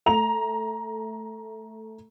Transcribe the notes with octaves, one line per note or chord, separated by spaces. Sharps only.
A3 A#5 F7